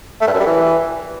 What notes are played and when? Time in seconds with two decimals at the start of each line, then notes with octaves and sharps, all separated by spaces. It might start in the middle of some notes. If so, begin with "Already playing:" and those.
0.21 A3
0.27 G2
0.34 F#2
0.40 G3
0.46 E3